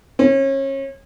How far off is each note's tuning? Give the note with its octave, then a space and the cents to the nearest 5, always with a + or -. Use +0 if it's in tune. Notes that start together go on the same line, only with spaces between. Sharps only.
C#4 -30